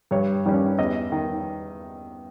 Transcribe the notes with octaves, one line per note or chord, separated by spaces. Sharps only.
G2 C#5
D#3 G3 C#4
E2 D#5
D#3